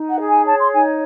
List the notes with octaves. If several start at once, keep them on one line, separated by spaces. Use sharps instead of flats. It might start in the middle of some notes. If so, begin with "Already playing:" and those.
Already playing: D#4
F#5
G#4
G#5
C#5 A5
C6
D#4 G#5